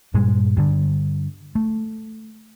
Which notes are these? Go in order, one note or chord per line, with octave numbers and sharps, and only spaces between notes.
G2 A#2 G3 G#3
G2 D3
A3